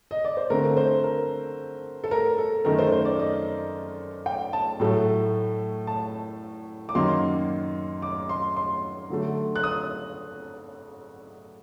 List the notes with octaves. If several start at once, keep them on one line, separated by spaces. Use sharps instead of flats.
D#5
D5
C5
D3 A3 C4 A#4
C5
A#4
A4
A#4
A4
F#2 D#3 A3 A#4
C5
C5
D5
D#5
G5
A5
A2 F#3 A3
A5
D6
F#2 D#3 F#3 A#3 C6
D6
C6
C6
D3 F#3 A3
F#6
D#6